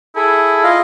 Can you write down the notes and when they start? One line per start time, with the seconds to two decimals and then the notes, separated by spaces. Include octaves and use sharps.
0.16 E4 G#4 A4
0.63 F4 D#5 F5